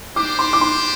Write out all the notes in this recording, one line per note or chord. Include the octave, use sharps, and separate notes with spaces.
D4 G4 C5 D6
C6
D6
C6